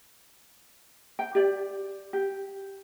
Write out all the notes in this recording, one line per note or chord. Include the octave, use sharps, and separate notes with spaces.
G5
G4 D5
G4